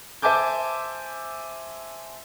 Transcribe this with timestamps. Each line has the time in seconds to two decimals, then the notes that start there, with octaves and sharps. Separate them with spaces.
0.22 C5 E5 G#5 A5 D6 G6